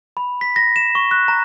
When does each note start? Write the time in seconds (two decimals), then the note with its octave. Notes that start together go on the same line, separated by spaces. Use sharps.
0.17 B5
0.41 B6
0.56 A#6
0.76 E7
0.95 C#6
1.11 F#6
1.28 A#5